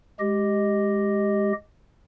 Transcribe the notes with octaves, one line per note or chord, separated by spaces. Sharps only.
G#3 G4 D#5